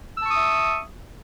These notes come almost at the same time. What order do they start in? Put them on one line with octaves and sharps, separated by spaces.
E6 A5 C#6 D#6 E5